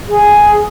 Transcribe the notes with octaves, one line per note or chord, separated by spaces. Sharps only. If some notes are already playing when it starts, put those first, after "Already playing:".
G#4